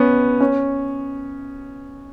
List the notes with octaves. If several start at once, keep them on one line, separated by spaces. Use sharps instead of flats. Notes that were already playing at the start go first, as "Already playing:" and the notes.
Already playing: B3 C#4
C#4